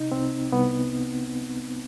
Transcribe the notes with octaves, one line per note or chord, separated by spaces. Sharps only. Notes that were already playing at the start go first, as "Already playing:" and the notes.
Already playing: C3 D#4
C2 C4
C2 B3